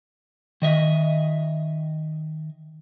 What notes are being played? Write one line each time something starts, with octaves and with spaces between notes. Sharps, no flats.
D#3 D#5 E5